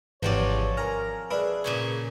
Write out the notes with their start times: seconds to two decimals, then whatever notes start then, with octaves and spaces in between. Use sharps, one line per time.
0.23 G#1 E2 C3 F3 C4 C#5 D5
0.77 A#4 G#5 A#5 F6
1.31 D4 G#4 B4 E5
1.64 A#2 C#3 C#5